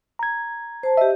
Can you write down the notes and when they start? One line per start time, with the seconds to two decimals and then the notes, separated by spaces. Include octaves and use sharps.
0.19 A#5 G#6
0.83 C5 A5
0.97 G4 D#5 E5